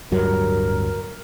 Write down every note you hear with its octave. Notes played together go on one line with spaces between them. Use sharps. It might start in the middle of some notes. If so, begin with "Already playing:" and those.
D1 G2 F#3 A#4